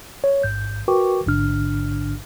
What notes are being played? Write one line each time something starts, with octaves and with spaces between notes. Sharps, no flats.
C#5
A1 G#2 G6
F#4 A#4 B4 G5 C#6 D6
A1 G#2 D3 D4 F6